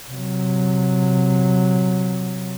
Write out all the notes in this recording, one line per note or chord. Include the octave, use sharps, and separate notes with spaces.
C3 F#3